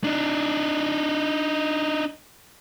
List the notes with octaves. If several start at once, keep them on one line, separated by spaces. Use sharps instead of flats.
D4 D#4